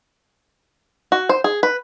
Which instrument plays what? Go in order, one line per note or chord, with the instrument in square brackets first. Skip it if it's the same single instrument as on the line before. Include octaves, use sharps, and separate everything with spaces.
[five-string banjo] F#4
C5
G#4
B4